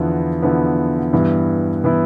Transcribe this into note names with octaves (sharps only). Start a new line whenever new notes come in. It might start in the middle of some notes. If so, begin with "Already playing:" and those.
Already playing: E2 D3 F3 B3 E4
E2 D3 F3 B3 E4
G2 E3 B3 E4
E3 B3 E4